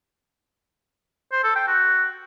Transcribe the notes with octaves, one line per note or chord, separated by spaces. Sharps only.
C5
A4
G5
F#4